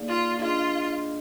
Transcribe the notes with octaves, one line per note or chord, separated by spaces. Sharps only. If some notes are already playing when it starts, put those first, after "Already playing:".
Already playing: A#3 D#4 G#4 D5 F5
F4
D4 F4 G#4 D#5